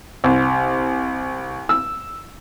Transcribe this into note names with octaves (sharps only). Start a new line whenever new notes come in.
C2
E6